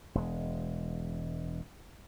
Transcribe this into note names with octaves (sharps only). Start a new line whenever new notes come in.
E1 G#3